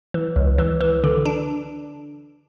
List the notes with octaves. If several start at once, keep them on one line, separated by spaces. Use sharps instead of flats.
E3
C#2
E3
E3
D3
D4